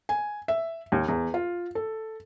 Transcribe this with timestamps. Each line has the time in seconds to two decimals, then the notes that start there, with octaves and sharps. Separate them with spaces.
0.09 G#5
0.48 E5
0.92 D#2
1.08 E2
1.34 F4
1.75 A4